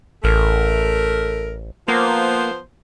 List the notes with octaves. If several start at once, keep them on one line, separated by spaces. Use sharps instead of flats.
A1 A3 A#4
F3 A#3 B3 C5